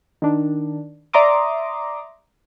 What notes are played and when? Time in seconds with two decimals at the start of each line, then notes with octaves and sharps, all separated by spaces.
0.22 D#3 D4
1.13 D5 E5 A#5 C6 D6 D#6